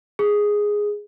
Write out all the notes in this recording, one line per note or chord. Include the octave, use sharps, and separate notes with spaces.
G#4